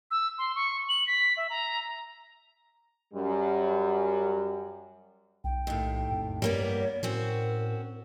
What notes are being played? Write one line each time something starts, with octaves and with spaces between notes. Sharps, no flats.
E6
C6
C#6
F#7
B6
E5
A#5
F#2 G3
B1 G5
D#2 A2
F2
G2 G3 A#3 B3 C#5
A2 C4 C#4 F#4 A#4